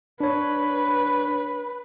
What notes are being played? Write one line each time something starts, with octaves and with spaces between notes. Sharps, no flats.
D4 B4 C#5